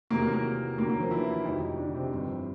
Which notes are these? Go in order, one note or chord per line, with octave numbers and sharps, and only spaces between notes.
E2 C3 D#3 F#3 A#3 A#4
A#3 A#4
A#3 A#4
D#2 D3 F#3 A#3 A#4
A#3 A#4
F3 F4
E3 E4
F1 F2 C3 D#3 F#3 D#4
D3 D4
C3 C4
G1 F2 C3 E3